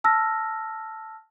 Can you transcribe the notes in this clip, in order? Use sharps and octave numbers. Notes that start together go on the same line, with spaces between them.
A5 E6 F6 A#6